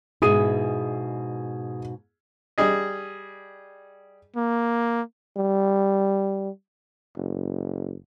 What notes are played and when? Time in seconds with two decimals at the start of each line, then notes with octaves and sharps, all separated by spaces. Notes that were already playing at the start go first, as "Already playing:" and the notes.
0.22 G#2 B2 E4 G#4 D#6 D#7
2.58 G3 G#4 D#5
4.36 A#3
5.37 G3
7.17 F#1